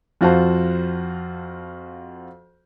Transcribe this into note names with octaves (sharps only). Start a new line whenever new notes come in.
F2 F4 F#4 C5 A5